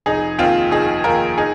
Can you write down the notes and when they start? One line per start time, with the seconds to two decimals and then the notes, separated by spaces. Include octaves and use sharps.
0.06 F1 D#4 G#4
0.39 D#2 D#3 C4 F4
0.71 F1 D#4 G#4
1.04 D#2 D#3 F4 A#4
1.37 D#4 G#4